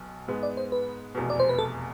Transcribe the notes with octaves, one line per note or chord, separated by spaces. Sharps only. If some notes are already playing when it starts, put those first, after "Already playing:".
Already playing: B1 B2
G#2 G#3 B3
D5
C5
B4
F1 E2 B2
D5
C5
B4
A4